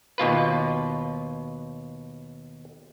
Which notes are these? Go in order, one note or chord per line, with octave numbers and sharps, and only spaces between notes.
D#2 B2 F4 B4